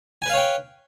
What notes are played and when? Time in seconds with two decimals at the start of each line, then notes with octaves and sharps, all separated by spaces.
0.22 G#5
0.26 B4
0.30 F5
0.33 C#5
0.37 G5